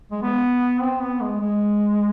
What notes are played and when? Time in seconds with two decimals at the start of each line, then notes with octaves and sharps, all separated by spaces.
0.12 G#3
0.22 B3
0.81 C4
1.02 B3
1.21 G#3
1.41 G#3